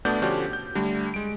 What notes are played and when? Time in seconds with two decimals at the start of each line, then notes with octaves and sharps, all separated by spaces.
0.05 B2 A3 B3 D4 D5 G6
0.22 D3 F3 C#4 D4 F#4 G4
0.53 G6
0.75 D3 G3 A3
1.14 G#3 D7